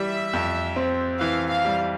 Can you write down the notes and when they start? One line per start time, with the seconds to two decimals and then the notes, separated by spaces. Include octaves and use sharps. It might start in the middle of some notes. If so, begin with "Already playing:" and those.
Already playing: E3 G3 E5
0.33 F2
0.76 C4
1.21 E3 F5
1.50 F5
1.65 G3